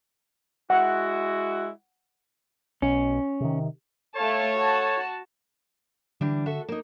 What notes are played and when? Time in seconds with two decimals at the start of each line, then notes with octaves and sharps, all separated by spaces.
0.70 G#3 E4 F#4 F#5
2.82 B1 B2 C#4
3.40 C3 D#3
4.16 A3 A4 C#5 F5 A5
4.57 F#4 A5
6.21 D3 E3 G3 D4
6.46 F#4 A4 E5
6.69 A#3 D#4